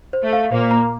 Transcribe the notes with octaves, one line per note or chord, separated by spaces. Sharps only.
C5
A3
F5
A#2 A#3 C5
A#5